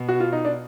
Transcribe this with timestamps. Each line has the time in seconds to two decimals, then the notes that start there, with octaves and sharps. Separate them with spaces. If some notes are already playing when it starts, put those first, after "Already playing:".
Already playing: B2
0.09 F#4
0.20 F4
0.33 D#4
0.45 D4